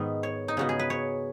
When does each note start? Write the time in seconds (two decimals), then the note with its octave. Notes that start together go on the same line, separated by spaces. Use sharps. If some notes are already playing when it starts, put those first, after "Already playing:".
Already playing: G#2 D#3 B3
0.23 C#5
0.48 D#4
0.57 C#3 B3 F#4
0.69 G#4
0.79 B4
0.90 C#5